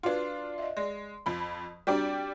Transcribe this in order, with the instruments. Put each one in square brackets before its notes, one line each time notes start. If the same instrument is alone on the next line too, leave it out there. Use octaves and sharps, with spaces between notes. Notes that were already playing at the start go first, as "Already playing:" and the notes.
[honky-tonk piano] D4 F4 [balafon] F#4 B4
[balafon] D#5 E5
[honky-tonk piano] G#3 [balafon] D5
[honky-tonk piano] F2 F3 B5
[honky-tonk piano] G3 G4 D5 [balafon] C4 D4 F#4